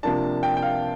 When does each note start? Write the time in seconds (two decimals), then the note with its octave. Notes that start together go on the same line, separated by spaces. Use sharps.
0.03 C3 F3 A#3 D4 A5
0.43 G5
0.57 G5
0.62 F5